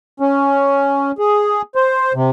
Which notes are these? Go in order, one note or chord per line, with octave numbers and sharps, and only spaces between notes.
C#4
G#4
C5
C3